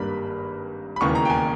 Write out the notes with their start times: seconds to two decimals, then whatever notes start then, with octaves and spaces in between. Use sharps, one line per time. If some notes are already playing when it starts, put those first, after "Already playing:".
Already playing: G#1 G2 G3 A#3 B5
0.96 B5
1.01 E1 D#2 C#3 E3 A#3 C#6
1.15 A#5
1.25 G5
1.30 G#5